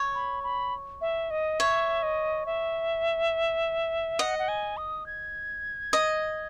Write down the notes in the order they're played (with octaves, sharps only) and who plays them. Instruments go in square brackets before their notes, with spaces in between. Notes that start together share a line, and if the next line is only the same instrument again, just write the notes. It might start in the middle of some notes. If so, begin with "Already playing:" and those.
Already playing: [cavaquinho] C#5
[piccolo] B5
B5
E5
D#5
[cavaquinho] C#5 [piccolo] E5
[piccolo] D#5
E5
[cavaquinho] D#5 [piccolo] F#5
[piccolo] F#5
G#5
D#6
G#6
[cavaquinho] D#5